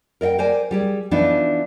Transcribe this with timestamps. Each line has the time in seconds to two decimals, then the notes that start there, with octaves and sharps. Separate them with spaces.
0.21 A#4 D5 D#5 F#5 G5
0.38 A#4 C5 D5 G#5
0.71 G3 G4 G#4
1.11 E3 F3 B3 D4 D#4